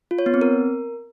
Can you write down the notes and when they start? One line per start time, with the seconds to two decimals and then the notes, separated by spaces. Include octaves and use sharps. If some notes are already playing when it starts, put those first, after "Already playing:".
0.11 F4
0.19 C#5
0.26 B3
0.34 C4
0.41 A#4